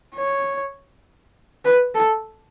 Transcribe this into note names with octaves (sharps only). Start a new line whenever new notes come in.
C#5
B4
A4